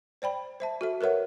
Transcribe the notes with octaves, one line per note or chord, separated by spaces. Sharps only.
C5 D5 G5 B5
C5 E5 A5
F#4 A4 E5
A#4 B4 C#5 E5 F#5